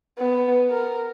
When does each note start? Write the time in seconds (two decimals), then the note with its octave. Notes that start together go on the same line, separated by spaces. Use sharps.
0.19 B3
0.71 A#4